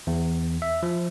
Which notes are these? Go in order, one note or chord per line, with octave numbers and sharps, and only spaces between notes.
E2
E5
F3